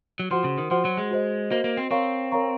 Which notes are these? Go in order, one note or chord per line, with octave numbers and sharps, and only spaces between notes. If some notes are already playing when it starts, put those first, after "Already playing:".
F#3
F3 F#4 C5 F#5 C6
C#3
D#3
F3 F#4 C5 F#5 C6
F#3
G#3
F#4 C5 D#5
A#3 F#4 C5 D#5
A#3
C4
C4 A#4 C#5 F5 A#5 C#6
A#4 C#5 F5 A#5 C#6